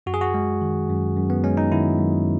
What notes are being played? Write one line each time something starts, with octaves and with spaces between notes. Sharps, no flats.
F#2 F#4
G#4
F#4
G#3
D#3
F#2
F#2
B3
G#3 C#4
D#4
D#3 E4
F#2